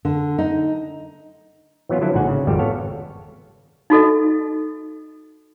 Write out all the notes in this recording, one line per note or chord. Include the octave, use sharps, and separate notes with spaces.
D3
D#4
E3 F#3 B3 C#4 F4
D3 F3 F#3 D4 E4
A#1 G#2 D3 F#4 F#5 G#5
C#3
G#1 F2 G3 G4
B3 A4 C#5 F5
D#4 F#4 A4 D#5